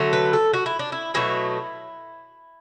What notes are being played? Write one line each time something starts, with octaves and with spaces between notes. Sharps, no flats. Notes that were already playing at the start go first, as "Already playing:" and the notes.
Already playing: D3 F#3 A3
B4
A4
F#4
E4
D4
E4
B2 F#3 A3 E4